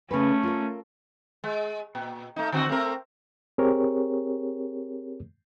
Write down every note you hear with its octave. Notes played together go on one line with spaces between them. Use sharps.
C#3 A3 C#4 B4
F4 A4 A#4
G#3
A#2
A3 D#4
D3 C4 F#4
A3 C4 A#4
C4 G4 G#4 A#4 C#5